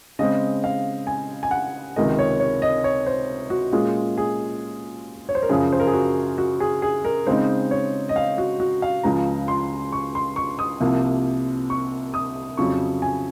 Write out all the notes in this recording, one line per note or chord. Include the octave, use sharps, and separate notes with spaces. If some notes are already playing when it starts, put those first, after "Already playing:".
C#3 G#3 C4 D#5
F5
G#5
G#5
F#5
C#2 C3 D#3 G#3 D#5
C#5
C#5
D#5
C#5
C5
F#4
A#2 G#3 C#4 F4 G#4
G#4
C#5
C5
A#4
F#2 C#3 F3 G#4
C5
A#4
G#4
F#4
F#4
G#4
G#4
A#4
C#3 G#3 C4 D#4 C5
C#5
D#5
F5
F#4
F#4
F5
C#2 C#3 F3 A#5
C6
C#6
C6
C#6
D#6
C2 C3 F3 A#3
C#6
D#6
F2 C#3 F#3 C#6
G#5